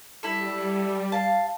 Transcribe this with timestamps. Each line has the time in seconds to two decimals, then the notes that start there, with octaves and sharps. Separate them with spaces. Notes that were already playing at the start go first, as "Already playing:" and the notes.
0.23 G3 E4 A4
1.12 F5 A5